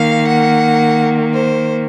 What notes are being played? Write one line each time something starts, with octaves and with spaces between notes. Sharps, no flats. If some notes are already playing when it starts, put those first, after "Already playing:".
Already playing: D#3 A#3 F5
F#5
C5